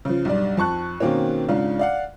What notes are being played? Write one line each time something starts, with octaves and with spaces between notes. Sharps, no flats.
C#3 F3
B1 G2 D5
F2 A5 C#6 F#6
B2 D#3 A#3 C4 C#4
G#2 C#3 D4 F4
D5 F5 F#5